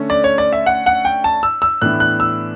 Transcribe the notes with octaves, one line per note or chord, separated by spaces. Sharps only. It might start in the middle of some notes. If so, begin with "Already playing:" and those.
Already playing: D3 A3 C#4
D5
C#5
D5
E5
F#5
F#5
G5
A5
E6
E6
A2 E3 B3 D4 F#6
F#6
E6